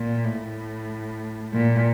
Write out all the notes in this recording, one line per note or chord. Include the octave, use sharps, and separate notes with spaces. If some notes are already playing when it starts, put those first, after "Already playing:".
Already playing: A#2
A2
A#2